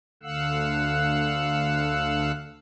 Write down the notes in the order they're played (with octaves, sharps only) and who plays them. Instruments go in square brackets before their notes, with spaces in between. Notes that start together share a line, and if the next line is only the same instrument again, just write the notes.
[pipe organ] D2 D3 F5 F#5 E6 F#6